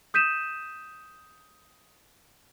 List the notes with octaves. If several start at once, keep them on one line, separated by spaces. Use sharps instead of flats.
D#6 G6 B6 D#7 E7